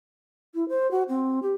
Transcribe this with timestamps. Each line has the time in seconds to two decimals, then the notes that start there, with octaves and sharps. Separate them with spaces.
0.55 E4
0.69 C5
0.91 F#4
1.09 C4
1.43 G4